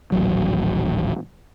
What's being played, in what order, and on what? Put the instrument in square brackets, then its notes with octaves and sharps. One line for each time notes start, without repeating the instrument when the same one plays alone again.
[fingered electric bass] D#1 A1 F#3